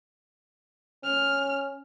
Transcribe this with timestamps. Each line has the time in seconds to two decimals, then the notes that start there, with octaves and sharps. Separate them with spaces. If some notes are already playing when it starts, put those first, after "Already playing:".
1.04 C#4 F6